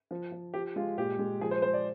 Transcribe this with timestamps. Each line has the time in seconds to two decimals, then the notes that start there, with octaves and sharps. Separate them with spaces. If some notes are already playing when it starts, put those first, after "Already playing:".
0.11 F3
0.32 F3
0.54 F3 G4
0.76 G#3 F4
0.98 A#2 G4
1.19 G#3
1.41 F3 G#4
1.51 C5
1.62 G#3 C5
1.74 D5